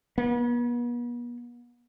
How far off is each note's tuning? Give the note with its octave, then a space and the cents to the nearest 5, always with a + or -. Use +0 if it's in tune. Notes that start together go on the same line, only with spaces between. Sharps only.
B3 -40